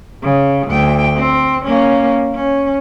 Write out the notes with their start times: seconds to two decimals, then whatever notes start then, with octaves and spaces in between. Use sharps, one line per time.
0.23 C#3
0.68 D2 G5
1.16 C4
1.65 A#3 C#4
2.35 C#4